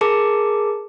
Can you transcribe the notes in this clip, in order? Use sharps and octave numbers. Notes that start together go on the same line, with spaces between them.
G#4 A#4 A5 D6